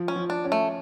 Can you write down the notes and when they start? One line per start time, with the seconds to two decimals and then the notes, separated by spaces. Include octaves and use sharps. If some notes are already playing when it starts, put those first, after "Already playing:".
Already playing: F3
0.08 C#4
0.16 F3
0.30 D4
0.45 C#4
0.52 A3